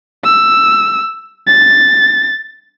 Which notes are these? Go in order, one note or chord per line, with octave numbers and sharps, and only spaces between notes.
E6
A6